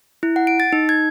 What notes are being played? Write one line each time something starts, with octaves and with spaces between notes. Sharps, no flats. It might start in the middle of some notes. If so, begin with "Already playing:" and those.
E4
F#5
D7
A6
D#4
G#6